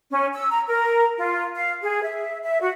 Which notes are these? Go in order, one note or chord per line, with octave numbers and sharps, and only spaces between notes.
C#4
E6
A#5
A#4
F4
F5
G#4
E5
E5
F#4